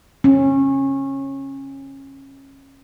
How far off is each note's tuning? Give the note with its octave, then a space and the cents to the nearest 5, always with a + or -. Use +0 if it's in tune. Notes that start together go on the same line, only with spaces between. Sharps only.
C#4 -25